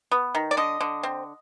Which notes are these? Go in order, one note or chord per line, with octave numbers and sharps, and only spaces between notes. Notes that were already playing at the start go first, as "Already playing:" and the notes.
B3
D#3
D5
D3 D#5
D3
C4